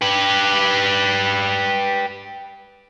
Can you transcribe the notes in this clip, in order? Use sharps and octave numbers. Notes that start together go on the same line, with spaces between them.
G4 B4